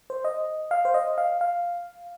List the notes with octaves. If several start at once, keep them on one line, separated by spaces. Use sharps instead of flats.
C5
D#5
F5
C5
D#5
F5
F5